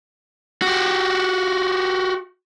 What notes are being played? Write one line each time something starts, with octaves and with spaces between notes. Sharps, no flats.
F#4 G4